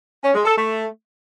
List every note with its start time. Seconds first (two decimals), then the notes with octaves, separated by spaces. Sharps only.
0.23 C#4
0.34 G#3
0.45 A4
0.56 A3